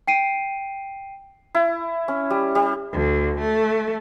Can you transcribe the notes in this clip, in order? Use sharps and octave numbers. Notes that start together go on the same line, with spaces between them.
G5 C7 D7 D#7
E4
C#4
G3
G3
D2
A3